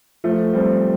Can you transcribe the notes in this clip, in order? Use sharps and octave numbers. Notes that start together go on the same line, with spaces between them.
F3 A3
G3 C4